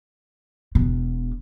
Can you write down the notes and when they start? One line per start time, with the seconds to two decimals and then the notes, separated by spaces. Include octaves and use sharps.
0.75 E1 B2